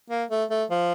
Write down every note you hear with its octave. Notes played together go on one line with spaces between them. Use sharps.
A#3
A3
A3
F3